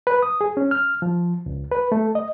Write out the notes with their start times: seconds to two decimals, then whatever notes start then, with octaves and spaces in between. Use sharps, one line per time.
0.07 B4
0.23 D#6
0.41 G#4
0.57 C#4
0.71 F6
1.02 F3
1.46 C#2
1.71 B4
1.92 A3
2.15 D#5